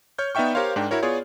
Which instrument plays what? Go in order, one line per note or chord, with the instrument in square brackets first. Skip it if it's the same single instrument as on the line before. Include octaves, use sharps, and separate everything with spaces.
[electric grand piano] C#5 F6 G6
B3 D#4 D5 E5 G5 C#6
G4 A#4 C5 C#5 F5 C6
G#2 D4 A#4 G5
E4 F#4 A#4 C#5
B3 F4 G#4 C#5 D5